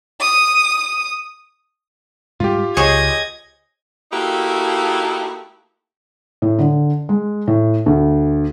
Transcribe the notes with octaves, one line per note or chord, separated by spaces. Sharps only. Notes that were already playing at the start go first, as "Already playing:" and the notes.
D#6
G#2 G3 F4 G4
C#2 G#4 C5 C#5 D#5 G#6
A3 A#3 D#4 E4 F#4 G4
A2
D3
G#3
A2
D2